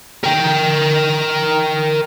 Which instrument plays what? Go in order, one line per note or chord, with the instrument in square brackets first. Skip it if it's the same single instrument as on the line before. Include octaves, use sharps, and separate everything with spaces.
[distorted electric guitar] A#4 G5